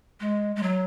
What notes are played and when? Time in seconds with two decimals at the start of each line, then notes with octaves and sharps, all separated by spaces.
0.20 G#3
0.56 G#3
0.63 F#3